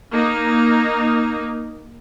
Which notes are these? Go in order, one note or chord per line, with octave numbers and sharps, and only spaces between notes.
A#3 D#4